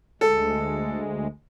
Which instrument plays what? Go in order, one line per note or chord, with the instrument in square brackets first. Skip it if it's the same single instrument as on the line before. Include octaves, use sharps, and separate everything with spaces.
[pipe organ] D2 G#3 [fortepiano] A4